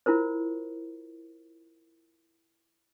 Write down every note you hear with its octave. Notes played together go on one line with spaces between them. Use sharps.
E4 F4 A#4 C5